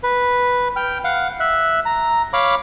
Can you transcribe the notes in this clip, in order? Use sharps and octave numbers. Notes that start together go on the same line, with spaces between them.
B4
G5 F6
F5 F#5
E5 F#6
A#5
C#5 F5 B5 D6